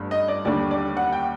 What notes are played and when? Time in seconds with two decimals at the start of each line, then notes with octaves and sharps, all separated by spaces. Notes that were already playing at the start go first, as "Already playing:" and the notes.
Already playing: G1 G2 A3
0.11 D#5
0.28 D5
0.45 D#2 D3 G3 D4 D5
0.71 D5
0.97 F#5
1.13 G5